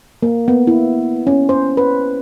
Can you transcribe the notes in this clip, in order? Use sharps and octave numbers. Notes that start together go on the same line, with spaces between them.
A#3
B3
E4
C#4
C5
B4